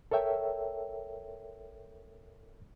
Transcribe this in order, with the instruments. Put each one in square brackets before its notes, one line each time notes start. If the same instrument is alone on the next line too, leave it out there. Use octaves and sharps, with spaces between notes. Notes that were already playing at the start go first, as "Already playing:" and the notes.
[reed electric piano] A4 A#4 C#5 E5 G5